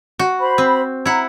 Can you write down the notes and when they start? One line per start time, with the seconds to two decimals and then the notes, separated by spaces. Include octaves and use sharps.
0.19 F#4
0.40 C5 B5
0.58 C4
1.06 E4 F#5 A#5